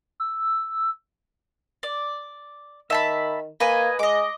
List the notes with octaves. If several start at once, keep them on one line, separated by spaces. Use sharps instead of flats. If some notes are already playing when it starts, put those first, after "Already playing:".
E6
D5
D#3 E5 A5 B5
A#3 B4 D#5 G#5
G#3 D#5 D6